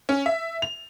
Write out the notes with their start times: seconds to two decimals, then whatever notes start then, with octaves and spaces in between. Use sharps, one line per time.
0.09 C#4
0.26 E5
0.62 F7